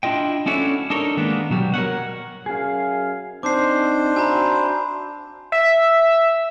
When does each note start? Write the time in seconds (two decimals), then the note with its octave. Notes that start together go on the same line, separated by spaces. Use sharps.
0.03 D4 E4 F4 D#5 G5
0.46 C#4 D4 E4 F#4 A4 C#5
0.90 D4 D#4 A4 A#4 C#5
1.17 D#3 G#3 A#3 B3 D4
1.50 B2 F#3 G3
1.74 A#4 B4 C#5 F#5
2.46 F#2 G#4 F5
3.43 C4 D4 D#4 C5 D6 C7
4.16 F#4 E5 G#5 A#5 B5
5.52 E5